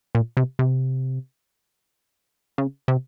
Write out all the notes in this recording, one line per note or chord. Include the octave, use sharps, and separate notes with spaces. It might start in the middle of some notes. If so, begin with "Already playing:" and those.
A#2
C3
C3
C#3
C3